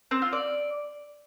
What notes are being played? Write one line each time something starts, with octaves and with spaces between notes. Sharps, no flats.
C4
F4
D5